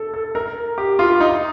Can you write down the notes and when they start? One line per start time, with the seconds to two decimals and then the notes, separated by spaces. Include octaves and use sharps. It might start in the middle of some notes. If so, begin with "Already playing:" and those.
Already playing: A4
0.14 A4
0.35 A#4
0.78 G4
0.99 F4
1.20 D#4